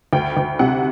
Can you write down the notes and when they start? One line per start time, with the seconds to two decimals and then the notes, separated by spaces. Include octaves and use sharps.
0.13 D2 G5
0.37 D2
0.59 C3 F#5